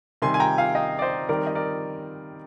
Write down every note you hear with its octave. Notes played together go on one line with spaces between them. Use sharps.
C3 D#3 G3 G#5 C6
G#5
G5 A#5
F5 G#5
D#5 G5
D5
C5 D#5
D#3 G3 C4 A#4 D5
D#5
A#4 D5